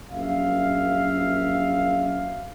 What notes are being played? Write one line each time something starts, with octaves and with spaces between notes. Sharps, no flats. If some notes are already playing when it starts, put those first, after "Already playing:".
A#1 F#2 E5 F5